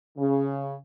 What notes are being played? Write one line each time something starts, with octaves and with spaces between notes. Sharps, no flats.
C#3